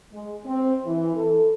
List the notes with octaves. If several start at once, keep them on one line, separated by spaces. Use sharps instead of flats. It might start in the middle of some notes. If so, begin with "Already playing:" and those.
G#3
C4
E3
A4